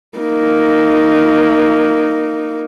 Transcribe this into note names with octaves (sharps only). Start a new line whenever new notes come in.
A#3 D#4